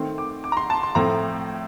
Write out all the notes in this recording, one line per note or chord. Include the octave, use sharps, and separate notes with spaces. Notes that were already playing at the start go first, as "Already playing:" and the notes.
Already playing: D#3 A3 C4
D6
D6
A#5
C6
A5
C6
A2 F3 A3 C4 A#5